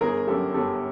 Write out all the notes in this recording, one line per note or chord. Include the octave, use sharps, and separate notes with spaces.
G1 G#4 A#4
F#2 G4 A4
G1 G4 A4